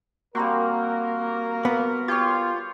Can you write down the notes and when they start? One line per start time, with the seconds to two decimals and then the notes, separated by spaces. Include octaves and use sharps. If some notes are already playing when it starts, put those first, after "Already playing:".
0.35 G3 A#3 C4 F#4 A#4
1.65 B3
2.08 F4 G4 C#5